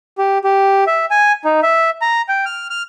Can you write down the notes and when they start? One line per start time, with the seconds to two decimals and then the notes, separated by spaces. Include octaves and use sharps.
0.18 G4
0.44 G4
0.87 E5
1.11 G#5
1.45 D#4
1.63 E5
2.02 A#5
2.29 G5
2.46 F6
2.70 F6